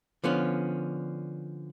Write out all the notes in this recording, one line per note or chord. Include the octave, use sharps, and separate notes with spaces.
D3 F3 B3 C#4